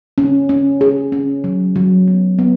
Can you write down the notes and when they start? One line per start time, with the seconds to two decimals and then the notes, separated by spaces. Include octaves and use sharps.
0.18 C#4
0.49 C#4
0.81 G#4
1.12 C#4
1.44 F#3
1.76 F#3
2.08 B3
2.39 B3